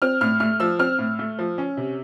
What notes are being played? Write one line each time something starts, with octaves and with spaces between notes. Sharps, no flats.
C4 F6
A2 F6
A3 F6
F3 E6
C4 F6
A2
A3
F3
C#4
C3